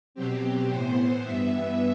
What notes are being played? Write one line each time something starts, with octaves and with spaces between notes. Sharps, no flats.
B2 F#3 C4 G4
A2 E3 B3 C5
G2 E3 B3 E5